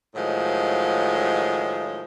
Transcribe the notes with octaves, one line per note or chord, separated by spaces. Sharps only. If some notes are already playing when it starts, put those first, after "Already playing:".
A2 D#3 F3 F#3 G#3